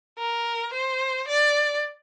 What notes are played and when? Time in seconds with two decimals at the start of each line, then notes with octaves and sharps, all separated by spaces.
0.18 A#4
0.73 C5
1.28 D5